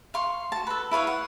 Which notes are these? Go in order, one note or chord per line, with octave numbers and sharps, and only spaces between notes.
F5 C6 C#6
F#4 A5
A4 B4
E4 B4 C#5 F5
F#5